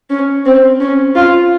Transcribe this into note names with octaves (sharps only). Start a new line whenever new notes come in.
C#4
C4
C#4
F4